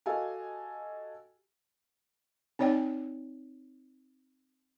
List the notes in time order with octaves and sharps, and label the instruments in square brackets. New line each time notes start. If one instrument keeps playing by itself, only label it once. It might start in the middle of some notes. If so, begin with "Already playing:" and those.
[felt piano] F#4 G4 A4 D#5 F5 G#5
[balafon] C4 D#4 C#5 D5 G5